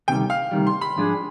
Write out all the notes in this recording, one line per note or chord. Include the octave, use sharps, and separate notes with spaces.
D2 C3 D#3 G3 G5
F5
D2 C3 D#3 G3
C6
B5
G#2 F3 G#3 D4 G#4